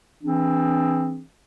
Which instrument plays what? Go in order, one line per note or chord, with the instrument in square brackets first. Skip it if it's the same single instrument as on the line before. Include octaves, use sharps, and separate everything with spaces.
[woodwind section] E3 C4 D4 G#4